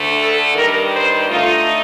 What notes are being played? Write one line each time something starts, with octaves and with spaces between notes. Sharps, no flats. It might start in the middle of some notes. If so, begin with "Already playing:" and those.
Already playing: D2 D3 A3
A4
G2 D#3 G3 A#4
C5
D3 A3 D#4 F4